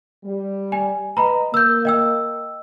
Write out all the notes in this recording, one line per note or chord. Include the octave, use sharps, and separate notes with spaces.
G3
G#5
B4 D#5 A#5 B5
A#3 A#4 E6 G6
D#5 G5 E6